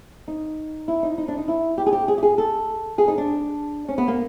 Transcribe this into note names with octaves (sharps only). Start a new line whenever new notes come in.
D#4
E4
D#4
D#4
D4
D#4
E4
G4
G#4
G4
G#4
G4
G#4
A4
G#4
D#4
D4
C#4
B3
A#3